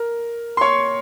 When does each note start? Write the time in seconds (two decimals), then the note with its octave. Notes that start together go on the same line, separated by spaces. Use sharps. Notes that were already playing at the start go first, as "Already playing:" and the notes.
Already playing: A#4
0.57 C6
0.61 C#5 C#6